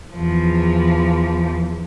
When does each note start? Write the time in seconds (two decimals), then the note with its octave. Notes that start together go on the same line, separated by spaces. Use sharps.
0.13 E2 F3